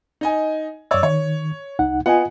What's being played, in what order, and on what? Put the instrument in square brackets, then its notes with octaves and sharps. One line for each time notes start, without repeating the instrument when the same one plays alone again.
[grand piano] D#4 D#5 G#5
[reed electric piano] F#2 E6 [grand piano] C#5 D5
[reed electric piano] D#3 [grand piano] C#5
[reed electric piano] C2 D#4 F#5
[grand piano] B3 F#5 [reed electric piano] F4 D#5 G#5